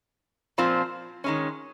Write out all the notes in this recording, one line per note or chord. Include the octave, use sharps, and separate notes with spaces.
A#2 F3 C4 F4
D#3 G#3 C#4